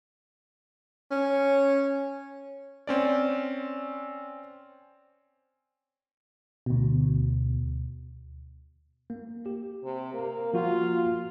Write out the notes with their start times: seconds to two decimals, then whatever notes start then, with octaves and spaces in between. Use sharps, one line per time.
1.11 C#4
2.87 C4 C#4 D5
6.66 D2 B2
9.10 A#3
9.46 G4
9.84 C3
10.14 A#3
10.54 F3 A#3 F4 F#4